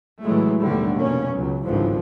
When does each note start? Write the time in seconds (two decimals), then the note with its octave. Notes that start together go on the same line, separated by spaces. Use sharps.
0.24 A2 E3 F#3 G#3 A3
0.63 D#2 B2 D3 G3 A3
0.99 F1 B2 A#3 C#4
1.34 C#2 F#3
1.67 G#1 C#2 G2 D3 E3 F3